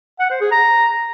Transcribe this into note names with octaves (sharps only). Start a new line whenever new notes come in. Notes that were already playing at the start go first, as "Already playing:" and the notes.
F#5
C5
G#4
A#5